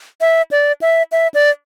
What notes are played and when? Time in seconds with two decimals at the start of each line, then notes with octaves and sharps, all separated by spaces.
0.21 E5
0.51 D5
0.82 E5
1.12 E5
1.34 D5